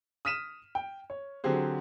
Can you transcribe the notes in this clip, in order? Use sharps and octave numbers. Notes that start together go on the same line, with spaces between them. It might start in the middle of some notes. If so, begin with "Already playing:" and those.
D#6 F6 B6 D#7 E7
G5
C#5
D3 F#3 C4 G4 G#4 C5